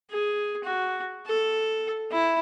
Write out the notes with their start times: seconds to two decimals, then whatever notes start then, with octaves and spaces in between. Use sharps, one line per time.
0.11 G#4
0.64 F#4
1.27 A4
2.11 E4